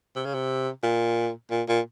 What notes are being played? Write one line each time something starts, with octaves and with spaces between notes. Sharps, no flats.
C3
C#3
C3
A#2
A#2
A#2